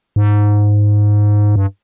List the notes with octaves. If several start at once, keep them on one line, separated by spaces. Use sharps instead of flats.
G#2
G2